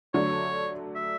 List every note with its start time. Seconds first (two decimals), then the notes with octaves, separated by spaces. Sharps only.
0.14 D3 F#3 A3 D4 C#5
0.96 E5